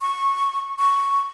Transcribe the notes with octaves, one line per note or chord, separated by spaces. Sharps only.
C#6
C#6